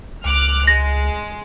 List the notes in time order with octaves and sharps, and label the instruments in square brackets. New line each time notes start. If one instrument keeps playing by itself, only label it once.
[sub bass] C#2 [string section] D6 F6 F#6
[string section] G#3 [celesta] A#6